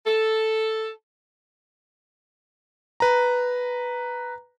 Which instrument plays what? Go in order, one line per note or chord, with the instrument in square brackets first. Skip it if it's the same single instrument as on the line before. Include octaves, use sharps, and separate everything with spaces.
[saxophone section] A4
[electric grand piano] B4 A#5